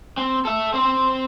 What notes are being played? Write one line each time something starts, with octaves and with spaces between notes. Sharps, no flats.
C4
A4 E5
C4 C5